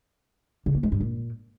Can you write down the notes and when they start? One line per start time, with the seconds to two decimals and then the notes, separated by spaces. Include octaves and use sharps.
0.66 C#3
0.75 A#3
0.83 G#3
0.92 G2
1.00 A#2